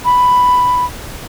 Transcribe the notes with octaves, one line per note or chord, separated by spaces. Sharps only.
B5